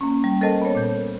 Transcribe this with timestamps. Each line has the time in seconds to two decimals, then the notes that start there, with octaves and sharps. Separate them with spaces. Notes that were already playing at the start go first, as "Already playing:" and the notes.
0.01 A#3 C#4
0.24 G3
0.41 A4 A#4 C5 D#5 A5
0.62 B3 C#5
0.75 A#2 G6